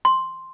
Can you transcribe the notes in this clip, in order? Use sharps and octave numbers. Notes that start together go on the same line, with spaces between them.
C6